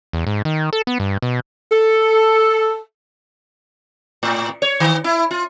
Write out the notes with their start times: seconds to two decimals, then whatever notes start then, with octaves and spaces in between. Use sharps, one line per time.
0.13 E2
0.27 G#2
0.45 D#3
0.73 A4
0.87 B3
1.00 G2
1.22 B2
1.72 A4
4.23 A2
4.62 C#5
4.80 D#3
5.04 E4
5.31 F4